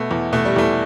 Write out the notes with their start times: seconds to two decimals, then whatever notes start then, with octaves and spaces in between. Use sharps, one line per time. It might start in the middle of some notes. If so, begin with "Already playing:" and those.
Already playing: B2 A3
0.11 E2
0.33 B2 A3
0.45 G3
0.56 E2 A3